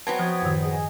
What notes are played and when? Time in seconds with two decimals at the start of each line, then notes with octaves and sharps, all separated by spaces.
0.07 F#3 B3 C4 A5 G#6
0.19 F3 F#4 D#6 G#6
0.42 F#2 A2 D#3
0.62 G#4 D#5 D#6